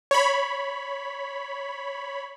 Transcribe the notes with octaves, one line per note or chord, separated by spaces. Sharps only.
C#5 B5